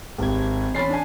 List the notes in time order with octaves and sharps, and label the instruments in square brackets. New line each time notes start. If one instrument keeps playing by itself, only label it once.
[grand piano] G#1 [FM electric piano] G4 G#6
[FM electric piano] E2 C#4 C6 [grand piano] B5 A6 C7
[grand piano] D4 G#5